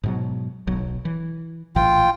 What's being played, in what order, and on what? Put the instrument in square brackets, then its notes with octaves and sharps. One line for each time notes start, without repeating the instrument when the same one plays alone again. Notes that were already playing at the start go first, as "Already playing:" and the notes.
[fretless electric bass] G#2 B2 F#3
D1 B1 F#3
E3
[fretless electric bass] A#1 A2 E3 [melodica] F4 G5